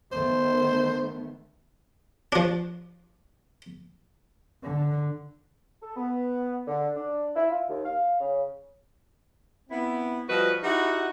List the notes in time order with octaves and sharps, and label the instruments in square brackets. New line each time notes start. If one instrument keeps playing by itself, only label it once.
[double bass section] D#3 A3 B3 [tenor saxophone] C5
[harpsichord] F3 D4
[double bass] D3
[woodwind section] A4
B3
D3
D4
E4
F4
D#2
F5
C#3
[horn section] B3 C4 E4
F3 G3 F#4 B4 D#5
D#4 E4 F#4 G4 F#5